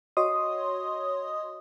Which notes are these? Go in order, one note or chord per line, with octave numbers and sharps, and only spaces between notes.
F#4 C#5 D#5 C6 D#6